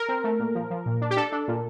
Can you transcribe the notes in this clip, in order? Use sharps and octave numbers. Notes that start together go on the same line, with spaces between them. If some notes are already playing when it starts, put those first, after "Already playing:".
Already playing: A#4
C4
A3
A#2
F3
F3
A#2
D4
G4
D4 A4
D4
A#2